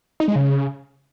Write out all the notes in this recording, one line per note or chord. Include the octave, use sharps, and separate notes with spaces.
D#4
G#3
C#3